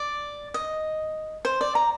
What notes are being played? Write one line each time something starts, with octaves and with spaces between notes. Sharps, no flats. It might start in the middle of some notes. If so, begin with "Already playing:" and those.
Already playing: D5
D#5
C5
D5
A#5